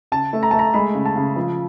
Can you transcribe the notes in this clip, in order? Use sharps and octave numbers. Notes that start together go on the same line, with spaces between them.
C#3 A5
A3
A#5
A3 A5
A#5
G#3 B5
C#3
A5
C#3
F3